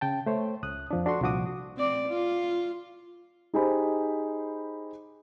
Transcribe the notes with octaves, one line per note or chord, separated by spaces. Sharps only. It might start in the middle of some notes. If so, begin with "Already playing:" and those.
C#3 G5 A5
A3 C5 C#5
C#2 D#6 F#6
F2 F3 D4
D4 F#4 A4 D5 C6 C#6
C2 A#2 F3 F#4 D6 D#6
C4 D5
F4
D#4 G4 G#4 C5 G#5 B5